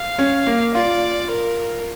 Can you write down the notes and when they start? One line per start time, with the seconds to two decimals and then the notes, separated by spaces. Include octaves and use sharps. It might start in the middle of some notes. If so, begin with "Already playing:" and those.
Already playing: F5
0.19 C#4
0.47 A#3
0.75 F4 D5
1.30 A#4